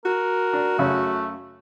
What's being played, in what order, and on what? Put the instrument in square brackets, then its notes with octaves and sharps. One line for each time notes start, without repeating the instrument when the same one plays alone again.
[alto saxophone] F#4 [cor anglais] A#4
[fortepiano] D4
[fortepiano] F#2 C#3 C#4 [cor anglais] A3